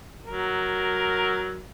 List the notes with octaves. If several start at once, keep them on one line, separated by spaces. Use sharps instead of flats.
F#3 A#4